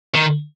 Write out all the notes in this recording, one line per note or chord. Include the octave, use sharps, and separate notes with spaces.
D#3